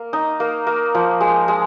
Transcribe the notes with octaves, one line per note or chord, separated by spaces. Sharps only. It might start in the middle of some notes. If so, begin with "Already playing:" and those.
Already playing: A#3
D#4
A#3
A#3
F3
G#3
G#3